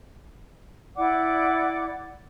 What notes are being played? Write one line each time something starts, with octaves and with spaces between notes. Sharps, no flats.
E4 D5 F#5 D6